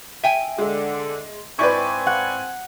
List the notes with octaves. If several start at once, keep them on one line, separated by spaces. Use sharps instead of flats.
E5 G5 G#5 D#7
D3 G#3
G#2 C4 E4 B4 D5 G#5 C#6
F#5